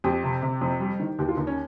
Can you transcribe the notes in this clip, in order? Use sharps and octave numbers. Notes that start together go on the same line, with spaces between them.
F2 G4
C3
C3
F2
G3
D#3
D#2 G4
F4
D#2 D#4
C#4